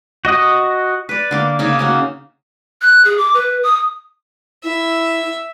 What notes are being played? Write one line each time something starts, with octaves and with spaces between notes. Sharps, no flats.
F#4 D#5 D#6
B4 D5
D3 A#3 D6
C#3 A#3 D#4
A#3 C#4 F#4
F#6
G#4
D6
B4
D#6
E4 E5